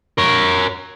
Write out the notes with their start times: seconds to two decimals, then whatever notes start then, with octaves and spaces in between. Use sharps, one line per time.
0.18 A#4 C#5